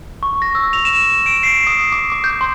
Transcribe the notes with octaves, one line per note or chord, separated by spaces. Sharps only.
C#6
A#6
E6
F7
E7
D7
C7
D#6
D6
D6
G6
C6